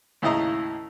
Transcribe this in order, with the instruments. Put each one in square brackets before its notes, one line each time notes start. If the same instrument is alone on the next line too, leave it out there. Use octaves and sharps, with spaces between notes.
[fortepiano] D#2 A2 C#3 E4 D#5 A#5